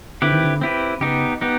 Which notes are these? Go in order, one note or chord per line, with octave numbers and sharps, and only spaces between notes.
D3 C4 E4 G4 B4
D#3
D3
C4 E4 G4 B4
C#3 B3 D#4 G4
B3 D#4 G4